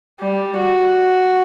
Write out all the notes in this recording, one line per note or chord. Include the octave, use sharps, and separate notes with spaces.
G3
F#4